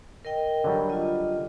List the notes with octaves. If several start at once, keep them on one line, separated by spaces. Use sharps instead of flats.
A#4 D#5 G5
D3 F#3 G3
F4 D#5